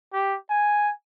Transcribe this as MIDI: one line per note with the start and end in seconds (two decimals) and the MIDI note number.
0.13 0.36 67
0.50 0.91 80